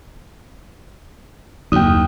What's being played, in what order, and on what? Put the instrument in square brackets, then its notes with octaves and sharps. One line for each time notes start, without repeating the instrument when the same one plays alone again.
[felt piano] F#1 [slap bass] D#2 [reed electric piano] G5 D#6